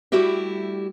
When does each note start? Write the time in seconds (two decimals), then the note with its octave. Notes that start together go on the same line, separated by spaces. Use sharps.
0.12 G3 A3 E4 F#4 G4 E5